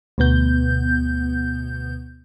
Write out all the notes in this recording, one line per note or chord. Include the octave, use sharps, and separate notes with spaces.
D2 B2 B3 G6